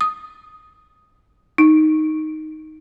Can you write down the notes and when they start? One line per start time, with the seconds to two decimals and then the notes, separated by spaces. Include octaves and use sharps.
0.01 D#6
1.58 D#4